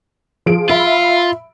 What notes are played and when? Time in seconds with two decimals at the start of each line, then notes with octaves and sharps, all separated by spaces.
0.46 F3 G#4 D7
0.70 F4 E5 B5